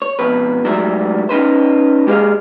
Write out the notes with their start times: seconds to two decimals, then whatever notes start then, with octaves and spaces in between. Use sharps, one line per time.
0.02 C#5
0.19 F2 B2 B4
0.64 G#2 F#3 G3 A3 E5
1.29 C#4 D#4 B4 C5
2.07 G#3 G4 G#4 D5 D#5 F5